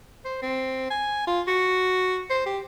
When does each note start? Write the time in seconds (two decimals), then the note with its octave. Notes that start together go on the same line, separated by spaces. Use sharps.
0.25 C5
0.42 C4
0.91 G#5
1.27 F4
1.48 F#4
2.30 C5
2.46 G4